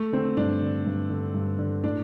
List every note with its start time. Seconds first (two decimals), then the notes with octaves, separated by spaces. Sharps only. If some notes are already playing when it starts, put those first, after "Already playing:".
Already playing: A3
0.13 D3 C4
0.37 G2 D4
0.62 D3
0.86 G2
1.10 D3
1.34 G2
1.59 D3
1.84 A2 D4